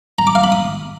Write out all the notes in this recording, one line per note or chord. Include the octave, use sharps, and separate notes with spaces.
A#5
D6
F5
B5
D#6